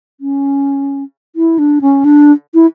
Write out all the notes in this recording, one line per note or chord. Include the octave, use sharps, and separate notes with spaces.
C#4
E4
D4
C#4
D4
E4